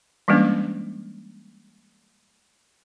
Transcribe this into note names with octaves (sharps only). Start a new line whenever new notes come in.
E3 G3 G#3 A#3 C#4 D4